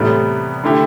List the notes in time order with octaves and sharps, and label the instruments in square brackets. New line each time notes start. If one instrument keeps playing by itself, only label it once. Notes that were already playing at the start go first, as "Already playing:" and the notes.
Already playing: [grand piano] E2 C3 G3 B3 [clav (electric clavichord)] A2
[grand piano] D3 A3 E4 G4